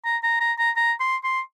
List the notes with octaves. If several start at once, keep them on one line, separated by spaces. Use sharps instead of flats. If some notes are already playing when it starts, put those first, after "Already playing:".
A#5
A#5
A#5
A#5
A#5
C6
C6